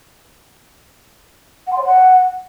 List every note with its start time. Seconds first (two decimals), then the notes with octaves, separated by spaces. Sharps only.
1.67 F#5
1.72 C6
1.78 C#5
1.84 F#5